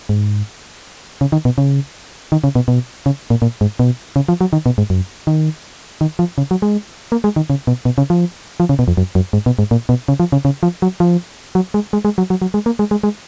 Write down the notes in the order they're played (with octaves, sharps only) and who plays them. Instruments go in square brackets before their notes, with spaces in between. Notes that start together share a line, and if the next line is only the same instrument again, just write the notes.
[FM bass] G#2
C#3
D#3
B2
C#3
D#3
C#3
B2
B2
C#3
A#2
A#2
G#2
B2
C#3
F3
F#3
D#3
B2
G#2
F#2
D#3
D#3
F3
C#3
F#3
G#3
A#3
G#3
D#3
C#3
B2
B2
C#3
F3
F3
C#3
B2
F2
F#2
F#2
G#2
B2
G#2
A#2
B2
C#3
F3
C#3
C#3
F3
F#3
F3
F#3
G#3
G#3
G#3
F#3
F#3
F#3
G#3
A#3
G#3
G#3
G#3